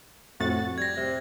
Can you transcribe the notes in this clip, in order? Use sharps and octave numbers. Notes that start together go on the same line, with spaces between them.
F2 A2 F#4 A6
G3 G#6 A#6
C3